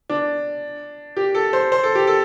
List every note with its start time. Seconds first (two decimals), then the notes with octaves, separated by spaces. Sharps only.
0.09 D4
1.17 G4
1.35 A4
1.53 C5
1.72 C5
1.83 A4
1.95 G4
2.07 A4